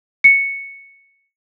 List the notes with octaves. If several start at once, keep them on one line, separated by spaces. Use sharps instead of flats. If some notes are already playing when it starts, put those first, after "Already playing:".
C#7